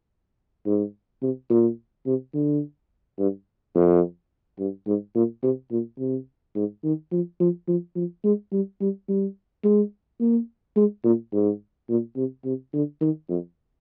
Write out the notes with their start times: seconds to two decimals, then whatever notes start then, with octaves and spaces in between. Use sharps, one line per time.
0.66 G#2
1.22 C3
1.50 A#2
2.06 C3
2.34 D3
3.19 G2
3.75 F2
4.59 G2
4.87 G#2
5.15 A#2
5.43 C3
5.71 A#2
5.99 C3
6.56 G#2
6.84 D#3
7.12 F3
7.40 F3
7.68 F3
7.96 F3
8.24 G#3
8.52 G3
8.81 G3
9.08 G3
9.64 G#3
10.20 A#3
10.76 G#3
11.04 A#2
11.33 G#2
11.89 A#2
12.16 C3
12.45 C3
12.73 D3
13.01 D#3
13.29 F2